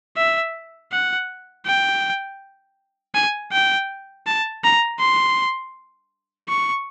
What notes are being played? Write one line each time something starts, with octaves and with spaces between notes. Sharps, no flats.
E5
F#5
G5
G#5
G5
A5
A#5
C6
C#6